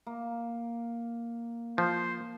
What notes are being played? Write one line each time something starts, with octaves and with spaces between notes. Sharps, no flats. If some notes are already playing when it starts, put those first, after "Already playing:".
A#3
F3 C5